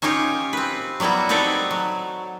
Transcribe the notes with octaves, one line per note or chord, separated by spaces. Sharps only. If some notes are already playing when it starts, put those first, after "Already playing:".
C#4 D#4 F4 G4 C#5
C4 B4
F#3 G3 B3 E4 F#4
C4 D#4 A4 B4 C#5 D5
F#3